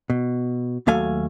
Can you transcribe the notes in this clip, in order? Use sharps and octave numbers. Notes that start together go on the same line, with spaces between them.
B2
D#2 F#3 A3 F5 G#5